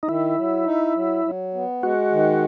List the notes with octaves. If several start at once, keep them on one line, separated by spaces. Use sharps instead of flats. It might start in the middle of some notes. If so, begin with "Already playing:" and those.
D#4
D#3 E4
F#3
D#4
F#3
F#3
B3
G#3 F#4
D#3